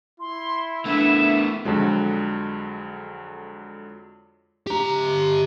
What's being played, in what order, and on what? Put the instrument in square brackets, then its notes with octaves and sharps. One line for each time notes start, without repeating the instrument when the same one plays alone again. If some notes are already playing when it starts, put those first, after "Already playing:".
[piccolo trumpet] E4 [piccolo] C6
[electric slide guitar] A3 B3 [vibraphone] D4 [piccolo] E5
[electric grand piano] F2 D3 F#3 G#3
[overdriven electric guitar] G4 A#5